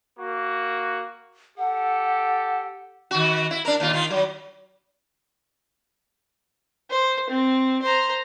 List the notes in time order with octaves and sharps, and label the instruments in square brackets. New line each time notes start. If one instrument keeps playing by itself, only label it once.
[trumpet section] A#3 F#4
[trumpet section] G4 A4 [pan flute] F#5
[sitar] D#3 F#4
E4
D4 A#4
D#2 A#2 F4
D#3 F4
F#3
[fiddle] C5
C4
C5 A#5